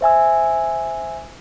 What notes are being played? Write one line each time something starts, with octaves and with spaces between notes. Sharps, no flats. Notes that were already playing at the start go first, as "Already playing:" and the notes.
C5 E5 G#5 E6